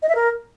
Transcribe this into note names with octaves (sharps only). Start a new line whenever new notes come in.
D#5
E5
A#4